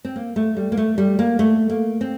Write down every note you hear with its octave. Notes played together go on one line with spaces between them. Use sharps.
C4
A#3
A3
G3
A#3
A3
G3
A#3
A3
A#3
C4